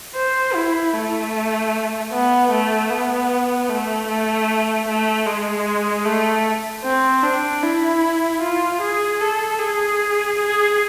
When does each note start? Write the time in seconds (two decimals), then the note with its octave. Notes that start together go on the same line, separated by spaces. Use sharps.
0.15 C5
0.55 E4
0.94 A3
2.12 B3
2.52 A3
2.91 B3
3.69 A3
4.08 A3
4.88 A3
5.27 G#3
6.05 A3
6.84 C4
7.23 D4
7.63 E4
8.42 F4
8.81 G#4
9.21 A4
9.59 G#4
10.38 G#4